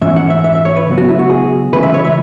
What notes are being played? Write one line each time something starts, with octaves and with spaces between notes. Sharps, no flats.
G#2 E3 C#4 E5
F#5
E5
E5
E5
C#5
B4
C#3 F#3 B3
F#4
E4
F#4
G#4
C#3 E3 G#3 C#4 B4
E5
C#5
E5